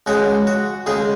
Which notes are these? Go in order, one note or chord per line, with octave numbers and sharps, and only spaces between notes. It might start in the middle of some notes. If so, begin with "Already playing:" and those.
C#2 C#3 G#3 F#4
F#4
C#2 C#3 G#3 G#4